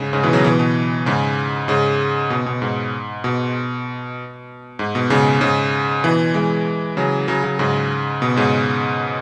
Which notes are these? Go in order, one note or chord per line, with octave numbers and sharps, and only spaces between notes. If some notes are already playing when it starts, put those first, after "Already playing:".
Already playing: G#2 C#3
G#2 C#3
B2 E3
C#3 F#3
B2 E3
B2
G#2 C#3
G#2 C#3
B2
B2
G#2
B2
G#2
B2
G#2 C#3
G#2 C#3
B2 E3
E3 G#3
C#3 F#3
C#3 F#3
C#3 F#3
G#2 C#3
B2
G#2 C#3